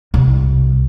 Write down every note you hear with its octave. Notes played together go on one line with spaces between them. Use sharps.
C2